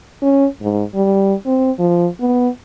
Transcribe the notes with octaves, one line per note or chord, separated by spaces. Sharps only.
C#4
G#2
G3
C4
F3
B3